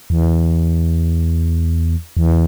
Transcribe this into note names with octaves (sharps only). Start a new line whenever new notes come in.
E2
E2